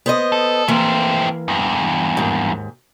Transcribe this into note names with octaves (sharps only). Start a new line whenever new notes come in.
B3 C5 D#5
A4
E3 A3 A#3 C4
E2 G2
D#2 G#2